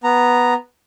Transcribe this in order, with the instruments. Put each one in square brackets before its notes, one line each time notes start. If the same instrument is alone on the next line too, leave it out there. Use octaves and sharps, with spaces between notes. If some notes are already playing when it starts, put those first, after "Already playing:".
[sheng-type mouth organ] B3 A#5